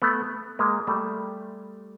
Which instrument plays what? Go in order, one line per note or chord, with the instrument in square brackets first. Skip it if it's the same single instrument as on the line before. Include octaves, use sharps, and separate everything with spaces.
[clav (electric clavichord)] A3 B3
G#3 A#3
G3 A3